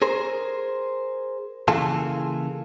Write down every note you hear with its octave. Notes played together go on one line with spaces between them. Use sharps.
G#4 A#4 C5
C#3 E3 A#3 F4 G#4 A4